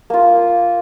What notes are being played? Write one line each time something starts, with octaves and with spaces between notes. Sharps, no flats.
A#3 F4